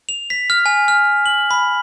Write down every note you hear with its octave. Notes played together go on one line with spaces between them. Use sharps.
F7
B6
F6
G#5
F6
F#7
B5